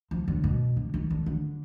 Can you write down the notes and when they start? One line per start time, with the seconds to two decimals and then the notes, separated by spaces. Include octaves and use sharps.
0.11 F3
0.28 D3
0.44 B2
0.76 D3
0.94 D#3
1.10 D3
1.26 D3